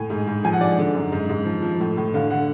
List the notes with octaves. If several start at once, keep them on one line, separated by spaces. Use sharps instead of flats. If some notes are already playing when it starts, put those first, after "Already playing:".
Already playing: A2 G#5
G#2
G#2
F3 G#5
F#5
G#2 D5
D3
F#2
G#2
G#2
F3
F3
A2
A2
D3 F5
D3 F#5